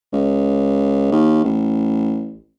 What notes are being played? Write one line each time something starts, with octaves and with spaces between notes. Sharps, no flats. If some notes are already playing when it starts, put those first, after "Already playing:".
C#2
D#2
A1